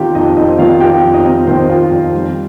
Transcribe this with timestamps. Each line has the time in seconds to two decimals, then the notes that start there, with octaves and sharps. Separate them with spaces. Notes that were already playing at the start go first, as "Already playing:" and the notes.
Already playing: D#3 C4 F4 G4 A#4 G5
0.15 F2 D#4 D#5
0.37 C4 D#4 D#5
0.58 D#3 F4 F5
0.80 F4 G4 G5
1.03 F2
1.14 D#4 D#5
1.25 C4
1.47 D#3 C5
1.70 F4
1.91 F2
2.14 G3